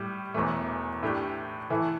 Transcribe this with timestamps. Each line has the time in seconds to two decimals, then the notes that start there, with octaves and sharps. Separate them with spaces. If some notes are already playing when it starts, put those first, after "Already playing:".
Already playing: A2 G3 G4
0.34 E1 E2 E3 A3
1.03 A2 A3 D4 G4
1.70 A2 E3 A3 E4 A4